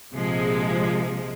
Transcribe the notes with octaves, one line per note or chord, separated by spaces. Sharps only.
A#1 C3 F3 G#3